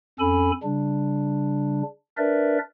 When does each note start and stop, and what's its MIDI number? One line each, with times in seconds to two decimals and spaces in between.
0.20 0.52 41
0.20 0.52 61
0.20 0.52 69
0.20 0.52 80
0.20 0.52 83
0.63 1.82 49
0.63 1.82 55
0.63 1.82 62
2.18 2.58 62
2.18 2.58 70
2.18 2.58 71
2.18 2.58 74
2.18 2.58 76